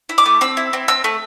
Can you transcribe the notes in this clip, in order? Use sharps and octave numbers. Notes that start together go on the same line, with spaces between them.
E4
D6
A3
C4 E6
E4
C4
C4 E6
A3